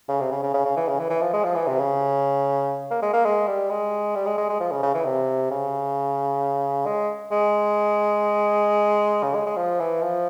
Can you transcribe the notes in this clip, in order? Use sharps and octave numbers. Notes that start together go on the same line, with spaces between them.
C#3
C3
C#3
C#3
C#3
C#3
E3
C#3
E3
E3
F3
G#3
F3
E3
C3
C#3
A#3
G#3
A#3
G#3
G3
G#3
G3
G#3
G#3
G#3
F3
C#3
C#3
E3
C3
C#3
G#3
G#3
C#3
G#3
G#3
F3
E3
F3